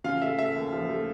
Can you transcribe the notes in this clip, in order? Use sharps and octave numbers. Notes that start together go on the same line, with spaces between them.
C#3 F4 F5
A3 E5
A3 E5
D#2
F3
A3